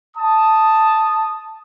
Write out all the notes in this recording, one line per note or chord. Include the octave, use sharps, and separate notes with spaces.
A5 D#6